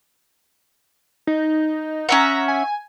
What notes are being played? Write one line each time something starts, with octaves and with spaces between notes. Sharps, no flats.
D#4
C#4 E5 F#5 A#5
G#5